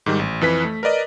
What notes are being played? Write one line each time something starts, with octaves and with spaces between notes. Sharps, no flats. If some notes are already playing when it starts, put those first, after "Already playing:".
G#2 D#3 G3
A1
F2 E3 B4 B6
A3
A#4 B4 D5 D#5